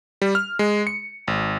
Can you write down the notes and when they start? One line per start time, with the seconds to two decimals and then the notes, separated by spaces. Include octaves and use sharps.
0.22 G3
0.35 F6
0.59 G#3
0.87 C#7
1.28 G#1